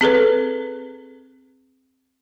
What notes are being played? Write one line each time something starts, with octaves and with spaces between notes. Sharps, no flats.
C4 G#4 A4 B4